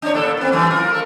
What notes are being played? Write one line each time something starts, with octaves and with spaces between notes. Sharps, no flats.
D4 C#5
A2 A#3 A4
B3 C4
F#2 E3 A3
F4 A#4
A3 A#4